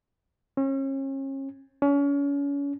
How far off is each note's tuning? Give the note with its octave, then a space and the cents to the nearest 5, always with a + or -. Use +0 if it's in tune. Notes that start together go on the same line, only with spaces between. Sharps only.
C#4 -35
C#4 +35